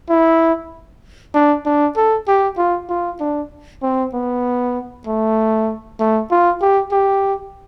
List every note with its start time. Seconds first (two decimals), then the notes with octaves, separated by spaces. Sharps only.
0.09 E4
1.34 D4
1.66 D4
1.97 A4
2.28 G4
2.58 F4
2.89 F4
3.20 D4
3.82 C4
4.13 B3
5.07 A3
5.99 A3
6.31 F4
6.61 G4
6.92 G4